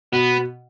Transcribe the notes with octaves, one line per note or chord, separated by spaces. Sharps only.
B2 B3